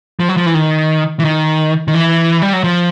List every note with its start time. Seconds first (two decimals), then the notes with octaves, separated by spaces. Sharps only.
0.20 F3
0.29 F#3
0.37 F3
0.46 E3
0.54 D#3
1.20 E3
1.25 D#3
1.88 D#3
1.94 E3
2.42 G3
2.53 F#3
2.64 F3